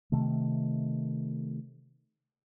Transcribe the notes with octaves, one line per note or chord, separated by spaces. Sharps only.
C3 D#3 A3